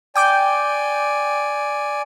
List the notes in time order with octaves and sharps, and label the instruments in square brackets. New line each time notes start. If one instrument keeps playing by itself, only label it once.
[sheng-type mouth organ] D5 G#5 [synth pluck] G5 D6 G6